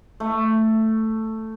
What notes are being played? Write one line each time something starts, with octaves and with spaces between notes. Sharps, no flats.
A3